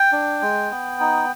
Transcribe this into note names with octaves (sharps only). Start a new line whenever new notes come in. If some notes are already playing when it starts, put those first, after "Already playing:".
Already playing: G5
D4
G#3
B3
D#4